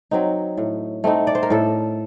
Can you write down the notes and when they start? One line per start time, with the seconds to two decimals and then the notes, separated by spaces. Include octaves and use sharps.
0.11 F#3 C4 D#4
0.57 A2
1.04 A3 C4 D#4
1.27 D5
1.35 C5
1.43 A#4
1.50 A2 A4